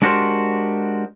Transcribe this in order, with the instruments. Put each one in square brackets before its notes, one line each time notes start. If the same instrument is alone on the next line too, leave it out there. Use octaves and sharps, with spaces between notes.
[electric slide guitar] G#3 D4 F#4 G4 A#4 C5